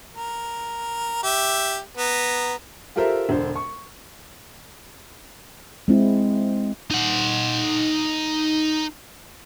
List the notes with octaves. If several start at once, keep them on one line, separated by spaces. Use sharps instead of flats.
A#4
G4 E5
B3 A#5
F4 G4 A4 A#4 C5 E5
E1 D3 C5
C#6
G#3 C4 E4
D#4 F#5